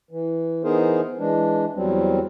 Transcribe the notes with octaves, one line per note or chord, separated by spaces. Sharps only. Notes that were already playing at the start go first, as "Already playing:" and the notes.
E3
E3 B3 D#4 G#4 A#4 C5
E3 G#3 D4
E2 F#3 G3 C4